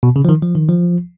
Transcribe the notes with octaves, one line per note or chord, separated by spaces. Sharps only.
B2
C#3
F3
D#3
F3
D#3
F3